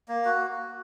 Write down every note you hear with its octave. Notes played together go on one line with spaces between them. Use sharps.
A#3
F#4